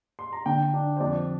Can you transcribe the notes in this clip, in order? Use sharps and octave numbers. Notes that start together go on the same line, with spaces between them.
C6
A#5
D3 G5
D4
C5
F2 D5